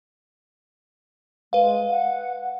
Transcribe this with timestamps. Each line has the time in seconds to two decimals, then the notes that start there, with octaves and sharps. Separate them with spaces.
1.53 G#3 B4 F5
1.89 F#5